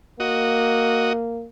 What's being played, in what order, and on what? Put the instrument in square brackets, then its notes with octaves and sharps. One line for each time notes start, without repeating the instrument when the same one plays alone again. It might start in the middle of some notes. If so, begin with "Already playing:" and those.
[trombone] A#3 [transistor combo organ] F#4 D#5